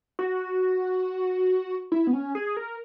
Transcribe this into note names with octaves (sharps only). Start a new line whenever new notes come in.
F#4
E4
B3
C#4
G#4
A#4